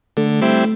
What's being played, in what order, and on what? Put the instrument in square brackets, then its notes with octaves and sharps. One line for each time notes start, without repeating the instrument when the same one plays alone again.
[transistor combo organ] D3 [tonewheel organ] A3
[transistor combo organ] G3 C4 E4